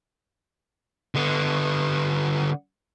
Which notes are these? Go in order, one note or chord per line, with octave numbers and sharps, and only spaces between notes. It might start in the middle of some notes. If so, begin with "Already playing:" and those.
D3 B3